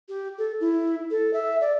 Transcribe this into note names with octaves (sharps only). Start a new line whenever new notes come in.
G4
A4
E4
A4
E5
D5